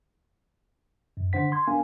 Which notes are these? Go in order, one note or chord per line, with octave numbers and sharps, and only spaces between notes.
F#2
D3 D4 C5 F#5 B6
C6 G#6
B3 D4 A#4 F5 G#5